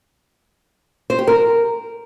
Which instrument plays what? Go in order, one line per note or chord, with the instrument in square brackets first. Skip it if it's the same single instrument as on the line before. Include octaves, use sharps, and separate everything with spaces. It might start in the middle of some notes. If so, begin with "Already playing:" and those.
[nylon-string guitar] C5
G4
A#4